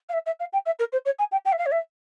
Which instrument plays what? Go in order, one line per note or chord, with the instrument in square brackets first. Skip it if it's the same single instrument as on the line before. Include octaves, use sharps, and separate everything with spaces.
[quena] F5
E5
E5
F5
G5
E5
A#4
C5
C#5
G#5
G5
G5
E5
F5
C#5
E5